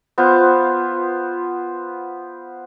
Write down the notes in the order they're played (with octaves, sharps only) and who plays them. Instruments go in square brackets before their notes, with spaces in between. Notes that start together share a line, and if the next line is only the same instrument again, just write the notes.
[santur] B3 F4 C5